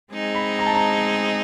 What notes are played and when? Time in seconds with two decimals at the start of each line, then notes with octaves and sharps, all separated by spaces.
0.12 G#3 C4 D#4 G#4
0.35 B5
0.59 A#5
0.66 A5
0.74 A#5